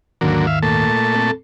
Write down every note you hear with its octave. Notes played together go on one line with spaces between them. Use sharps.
D#2 G#2 D3 D#3 F#3 A#3
E5 F5
A#2 A3 A5
C4 A4